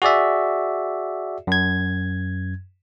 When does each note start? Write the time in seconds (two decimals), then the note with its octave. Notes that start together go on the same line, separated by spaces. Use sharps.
0.02 F#4 G#4 D5 E5
1.47 F#2 G#6